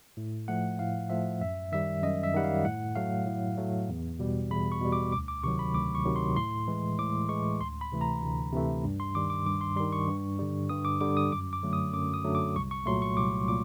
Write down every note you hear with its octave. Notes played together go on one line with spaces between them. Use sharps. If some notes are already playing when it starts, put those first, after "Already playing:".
A2
F3 A3 F#5
A2 F5
F3 A3 E5
F#2 E5
D#3 G3 E5
F#2 D#5
E5
D#3 G3 F#5
F5
A2 F#5
F#3 A3 F5
A2
F#3 A3
E2
B2 G3
E2 B5
C#6
B2 G3
D6
D2 D6
D6
C3 D#3 F#3 C#6
B5
D2 D6
C#6
C3 D#3 F#3
C6
A2 C6
E3 G#3
A2 D6
E3 G#3 C#6
D2 C6
B5
C3 E3 A3
A#5
D2
C3 E3 A3
G2
C6
D#3 G3 D6
D6
G2 D6
C6
D#3 G3 C6
C#6
G2
D3 G3
G2 D#6
D6
D3 G3 D6
D#6
F#2 D6
D6
D3 F#3 A3
D#6
F#2 D6
D#6
D3 F#3 A3
D6
C2 C#6
C#6
A#2 F#3 A3 C6
C#6
C2 D6
A#2 D6